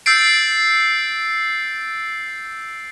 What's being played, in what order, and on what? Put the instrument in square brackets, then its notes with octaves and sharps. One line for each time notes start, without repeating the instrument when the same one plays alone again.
[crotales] E6 G6 A6 C7 D7